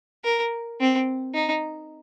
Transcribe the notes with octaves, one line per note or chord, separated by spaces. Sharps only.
A#4
C4
D#4